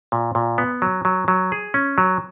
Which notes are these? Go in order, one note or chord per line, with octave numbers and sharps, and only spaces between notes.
A#2
A#2
B3
F#3
F#3
F#3
G#4
C#4
F#3